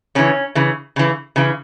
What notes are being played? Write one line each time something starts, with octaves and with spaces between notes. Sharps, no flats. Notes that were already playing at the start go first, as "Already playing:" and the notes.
C#3 E3 C#4
C#3 E3
C#3 E3
C#3 E3